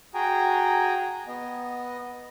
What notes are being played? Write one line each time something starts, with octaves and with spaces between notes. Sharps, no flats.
F#4 G#4 G5 G#5 A#5
B3 D#5